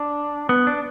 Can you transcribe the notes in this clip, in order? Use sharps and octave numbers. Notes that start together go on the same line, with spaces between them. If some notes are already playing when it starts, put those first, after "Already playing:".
Already playing: D4
B3
D4